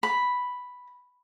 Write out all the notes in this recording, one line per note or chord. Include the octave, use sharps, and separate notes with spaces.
B5